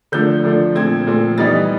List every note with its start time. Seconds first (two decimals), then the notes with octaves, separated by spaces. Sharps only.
0.12 D3 F3 A3 D4 G6
0.44 D3 F3 A3 D4
0.75 A#2 F3 A3 C4 G#6
1.07 A#2 F3 A3 C4
1.38 E3 G3 B3 D#4 A6